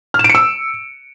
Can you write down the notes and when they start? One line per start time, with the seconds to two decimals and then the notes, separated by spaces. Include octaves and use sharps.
0.14 F6
0.19 E7
0.24 D7
0.30 C#7
0.35 E6